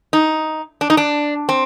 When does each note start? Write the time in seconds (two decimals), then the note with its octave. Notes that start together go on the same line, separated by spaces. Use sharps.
0.13 D#4
0.81 D4
0.90 D#4
0.97 D4
1.49 C4